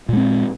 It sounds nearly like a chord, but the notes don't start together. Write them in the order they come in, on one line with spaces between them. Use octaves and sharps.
A#2 G#3 C4